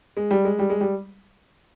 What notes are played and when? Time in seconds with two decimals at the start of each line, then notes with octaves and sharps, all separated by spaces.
0.17 G#3
0.31 G3
0.45 G#3
0.59 G3
0.70 G#3
0.81 G3